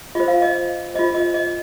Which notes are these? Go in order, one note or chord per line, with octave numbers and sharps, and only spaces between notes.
F4 C5 D#5
F5
D#5
F4 C5 D#5
D#5
D#5